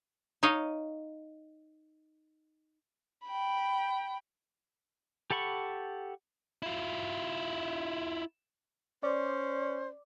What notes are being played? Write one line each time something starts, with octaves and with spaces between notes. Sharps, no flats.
D#4 C#5 D#5 F5
G5 B5
G4 A4 F#5 B5 C#6
E4 F4
C#4 C5 D5